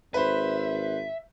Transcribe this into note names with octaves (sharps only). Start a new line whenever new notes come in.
G#1 B4 C5 E5